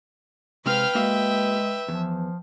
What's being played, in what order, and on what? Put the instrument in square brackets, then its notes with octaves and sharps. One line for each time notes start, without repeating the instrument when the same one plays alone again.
[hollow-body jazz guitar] C3 G#3 C4 [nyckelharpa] B4 G5 [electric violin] F5 F6
[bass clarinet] G#3 [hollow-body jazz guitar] A#3 F#4 F5 [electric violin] E5
[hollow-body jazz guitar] E2 [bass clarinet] F3